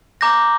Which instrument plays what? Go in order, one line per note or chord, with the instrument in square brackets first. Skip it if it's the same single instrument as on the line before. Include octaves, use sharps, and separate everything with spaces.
[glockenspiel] A#5 D6 G6 A#6